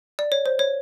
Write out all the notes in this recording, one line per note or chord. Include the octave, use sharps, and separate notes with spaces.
D5
C#5
C5
C#5